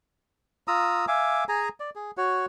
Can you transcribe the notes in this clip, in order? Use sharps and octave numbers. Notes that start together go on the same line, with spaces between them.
F4 A#5 D#6 E6
E5 F5 G#5 D6
G#4 G#5 A#5
D5
G#4
F#4 C#5